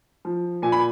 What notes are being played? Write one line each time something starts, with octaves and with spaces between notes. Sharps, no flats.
F3
A#2 G#5
B5